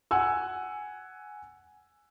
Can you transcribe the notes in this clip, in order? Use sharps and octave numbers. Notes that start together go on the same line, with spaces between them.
F#5 G#5 E6